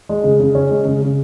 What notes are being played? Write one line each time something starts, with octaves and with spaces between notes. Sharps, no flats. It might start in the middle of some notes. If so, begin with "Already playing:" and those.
G#3
C#3
C#3
C#4
G#3
C#3
C#3